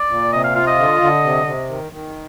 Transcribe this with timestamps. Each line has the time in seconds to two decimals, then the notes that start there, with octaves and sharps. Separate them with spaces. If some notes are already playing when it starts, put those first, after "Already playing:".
Already playing: D5
0.10 A#2
0.32 C3 D#5
0.44 F5
0.55 F4 F5
0.67 D#5
0.79 D3
1.01 D3
1.24 C3
1.46 C3
1.69 D#3
1.92 D#3